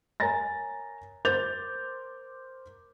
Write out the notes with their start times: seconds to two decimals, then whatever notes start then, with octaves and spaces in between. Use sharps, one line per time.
0.20 A#4 C#5 G#5 A#5 A6 A#6
1.25 A#4 C5 D6 G6 A6 F7